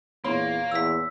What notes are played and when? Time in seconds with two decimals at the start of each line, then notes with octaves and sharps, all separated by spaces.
0.24 E2 A#2 A#3 C#5 C6
0.72 E2 E6 B6